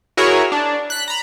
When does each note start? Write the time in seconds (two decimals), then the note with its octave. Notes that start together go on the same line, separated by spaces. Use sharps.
0.17 E4 F#4 G#4 A#4 C#5
0.52 D4
0.90 F#6 B6
1.08 A#5 B5